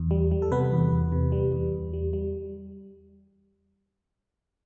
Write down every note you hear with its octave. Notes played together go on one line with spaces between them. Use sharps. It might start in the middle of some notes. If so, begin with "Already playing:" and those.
Already playing: E2
G3
G3
A4
C3 B3 B4
E2
E2
C3
G3
E2
E2
G3
G3